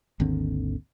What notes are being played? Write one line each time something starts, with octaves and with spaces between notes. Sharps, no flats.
G#1 D#2 D3 C4